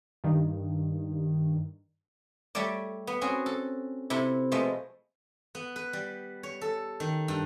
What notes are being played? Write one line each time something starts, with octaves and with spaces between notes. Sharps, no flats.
G2 D#3
G3 A3 A4 C#5 D5
B3
C4 C#4 F#4 G#4
A4
C3 E4 A4
B2 F3 G#3 A3
B3
B4
G3
C#5
A4
D#3
G2